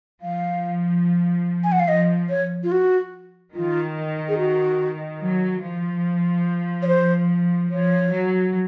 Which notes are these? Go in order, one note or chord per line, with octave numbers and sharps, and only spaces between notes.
F3 F5
G#5
F#5
F5
F3 D#5
C#5
F4
F#4
D#3 F4
G#4
F#4
F#3
F3
C#5
C5
F3 C#5
F#3